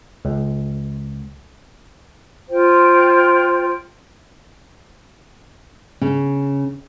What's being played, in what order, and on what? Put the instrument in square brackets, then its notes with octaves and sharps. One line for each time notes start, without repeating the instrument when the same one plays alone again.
[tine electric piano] C#2
[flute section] F4 C5 G5
[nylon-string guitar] C#3